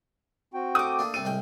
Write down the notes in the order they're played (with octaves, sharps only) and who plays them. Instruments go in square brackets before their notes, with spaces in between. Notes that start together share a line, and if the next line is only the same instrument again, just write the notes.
[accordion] C4 F#4 G5
[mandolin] A3 D6 [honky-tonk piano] D#6
[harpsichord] A#3 D4
[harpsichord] C2 C4 A4 [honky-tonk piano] D#7
[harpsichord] C2 G#3 G5 [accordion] A2